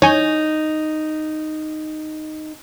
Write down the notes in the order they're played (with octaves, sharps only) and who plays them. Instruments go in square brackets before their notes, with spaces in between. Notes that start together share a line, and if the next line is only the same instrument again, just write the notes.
[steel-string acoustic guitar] D#4 [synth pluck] C#5 G#5 G6